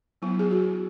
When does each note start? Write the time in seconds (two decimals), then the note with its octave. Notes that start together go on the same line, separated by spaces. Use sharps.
0.22 F#3 B3 E4
0.39 G#4
0.51 F#4